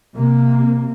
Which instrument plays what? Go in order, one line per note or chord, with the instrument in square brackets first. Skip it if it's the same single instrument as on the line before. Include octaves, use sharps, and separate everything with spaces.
[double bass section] C3 A#3